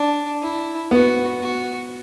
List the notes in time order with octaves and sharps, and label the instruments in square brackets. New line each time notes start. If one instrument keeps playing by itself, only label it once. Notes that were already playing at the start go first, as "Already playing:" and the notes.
Already playing: [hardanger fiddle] D4
E4
[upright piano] B3 [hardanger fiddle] F#4
[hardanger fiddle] F#4